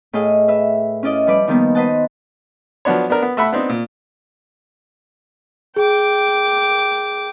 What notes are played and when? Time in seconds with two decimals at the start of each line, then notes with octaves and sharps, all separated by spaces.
0.13 A2 G#4 D#5 F5
0.48 B4 E5 E6
1.03 C#4 E4 F4 D5 D#5
1.27 F3 G3 B4 D5
1.48 D#3 F3 G3 A#3 B3
1.75 B4 C5 D#5 F#5 A5
2.85 F3 F#3 B3 D4 C#5
3.10 B3 D4 A#4
3.22 B3
3.37 A3 E5 F#5 B5
3.52 B3 C4 D4 D#4
3.69 A#2
5.76 G#4 G5 D6